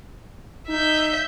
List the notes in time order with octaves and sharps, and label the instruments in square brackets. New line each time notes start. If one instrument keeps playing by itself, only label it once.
[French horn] D#4 [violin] E5 G6